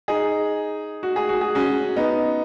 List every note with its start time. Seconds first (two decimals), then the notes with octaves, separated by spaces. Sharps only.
0.08 D#4 G#4
1.03 F#4
1.16 G#4
1.29 F#4
1.41 G#4
1.55 C#4 F#4
1.96 B3 D#4